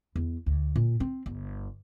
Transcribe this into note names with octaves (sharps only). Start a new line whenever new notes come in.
E2
D2
A#2
C4
G1